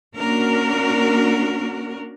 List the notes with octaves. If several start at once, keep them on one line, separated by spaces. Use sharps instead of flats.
A#3 C#4 D4 F#4 A#4